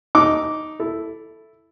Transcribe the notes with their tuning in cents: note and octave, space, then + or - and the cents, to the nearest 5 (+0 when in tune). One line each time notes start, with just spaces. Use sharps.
D#4 +0 D6 -10
E4 +0 A4 +0